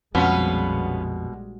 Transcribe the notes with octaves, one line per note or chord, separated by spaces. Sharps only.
A#1 F2 B2 G3 G#3 B3 C#4 F4